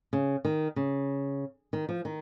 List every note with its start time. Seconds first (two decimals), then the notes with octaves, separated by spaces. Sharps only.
0.13 C#3
0.45 D#3
0.76 C#3
1.73 D#3
1.89 F3
2.05 D#3